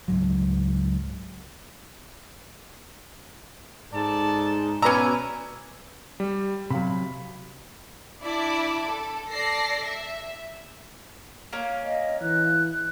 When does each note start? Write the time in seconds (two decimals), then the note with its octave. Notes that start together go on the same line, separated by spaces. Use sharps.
0.08 C#2 G#2 F#3
3.92 G#2 A4 D5 A5
4.82 B2 C#4 B4 D5 G#5 A#5 B5 E6
6.20 G3
6.70 C3 F#3 F5 B5
8.22 D4 E4 D5 A5 B5 D6
8.87 A4
9.32 A4 D5 A#6 C7
9.87 E5
11.53 A#3 C#4
11.84 D#5
12.22 E3 F#6